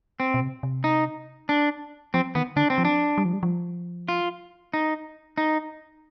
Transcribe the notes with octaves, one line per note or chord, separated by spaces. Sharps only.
C4
B2
C3
C3
D#4
D4
F3 C4
D#3 B3
D3 D4
C4
F3
D4
G3
F3
G3
F3
F4
D#4
D#4